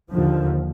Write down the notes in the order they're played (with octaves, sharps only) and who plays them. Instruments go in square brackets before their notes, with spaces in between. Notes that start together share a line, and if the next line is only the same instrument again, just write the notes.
[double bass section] D#2 D3 F3